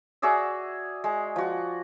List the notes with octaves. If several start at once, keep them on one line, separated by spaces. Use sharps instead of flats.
F#4 G#4 D5 E5
G#3
F3 F#4